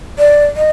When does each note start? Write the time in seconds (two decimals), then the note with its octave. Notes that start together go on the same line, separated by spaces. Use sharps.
0.19 D5
0.56 D#5